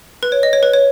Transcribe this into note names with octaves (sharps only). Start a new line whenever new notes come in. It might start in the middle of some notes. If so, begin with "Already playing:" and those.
B4
C#5
D#5
C#5
B4
C#5